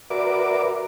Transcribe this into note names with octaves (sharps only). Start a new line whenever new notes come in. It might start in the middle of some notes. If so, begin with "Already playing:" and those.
F#4 A#4 B4 D5 E5 D6